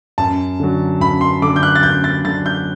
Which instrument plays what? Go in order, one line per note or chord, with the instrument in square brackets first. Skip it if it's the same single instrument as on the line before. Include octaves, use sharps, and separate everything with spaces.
[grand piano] F#2 A5
D3 F#3
F#2 B5
C6
D3 F#3 D6
G6
F#6
A6
F#2 G6
A6
D3 F#3 A6
G6